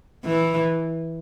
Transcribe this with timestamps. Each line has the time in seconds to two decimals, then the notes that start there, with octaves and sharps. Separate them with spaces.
0.24 E3